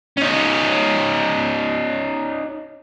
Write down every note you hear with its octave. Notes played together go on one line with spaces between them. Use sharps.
C#4 D#4